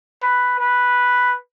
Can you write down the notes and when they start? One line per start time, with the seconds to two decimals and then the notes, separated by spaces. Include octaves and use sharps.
0.23 B4
0.59 B4